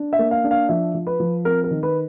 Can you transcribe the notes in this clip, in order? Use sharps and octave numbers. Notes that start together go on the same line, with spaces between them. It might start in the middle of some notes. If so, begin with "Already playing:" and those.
Already playing: D4
E5
A#3
F5
D4
F5
F3 E5
F3
B4
F3
C4 A#4
A#4
D#3
B4